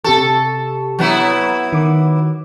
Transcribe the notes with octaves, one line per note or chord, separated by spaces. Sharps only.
C3 G4 A4 C#6
F#3 B3 E4
D#3 D6